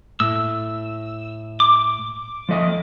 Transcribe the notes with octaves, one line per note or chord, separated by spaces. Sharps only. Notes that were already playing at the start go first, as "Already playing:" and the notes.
A2 E6
D6
F3 A3 D#5